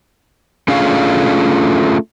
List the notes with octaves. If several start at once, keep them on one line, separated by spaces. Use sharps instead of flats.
A3 C#4 D4 F4 G#4 F5